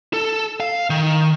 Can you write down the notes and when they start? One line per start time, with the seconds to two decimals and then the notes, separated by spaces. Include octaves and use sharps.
0.13 A4
0.60 F5
0.90 D#3